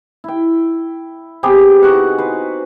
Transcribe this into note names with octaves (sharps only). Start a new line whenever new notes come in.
E4 G5
C3 B3 G4 G#4
D#4 F#4 F#5
B4 C5